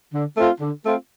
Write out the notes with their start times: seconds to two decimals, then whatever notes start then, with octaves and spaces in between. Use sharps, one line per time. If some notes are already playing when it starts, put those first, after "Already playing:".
0.14 D3
0.37 A3 C4 F4
0.60 D3
0.84 A3 C4 F4